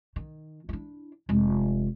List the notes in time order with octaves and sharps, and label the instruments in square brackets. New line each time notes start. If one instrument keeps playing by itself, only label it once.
[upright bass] D#3
D4 E4
F1 G#3